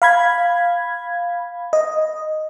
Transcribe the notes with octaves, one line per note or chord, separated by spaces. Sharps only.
F5 B5 G#6
D#5